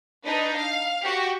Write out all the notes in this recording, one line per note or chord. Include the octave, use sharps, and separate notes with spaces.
D4 D#4 B4
F5
F#4 G4